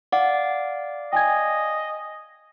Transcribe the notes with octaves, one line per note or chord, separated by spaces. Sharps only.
D5 F5 F#5 D6
D#5 G5 G#5 G#6